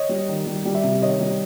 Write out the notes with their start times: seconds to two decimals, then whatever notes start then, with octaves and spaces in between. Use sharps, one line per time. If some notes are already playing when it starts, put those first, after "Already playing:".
Already playing: C#5 D#5
0.09 G3
0.29 D#3
0.46 G3
0.65 G3
0.75 D5 E5
0.84 C3
1.01 D#3 C#5 D#5
1.20 G3